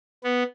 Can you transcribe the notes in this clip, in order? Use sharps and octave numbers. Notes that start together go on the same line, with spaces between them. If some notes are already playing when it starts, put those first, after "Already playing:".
B3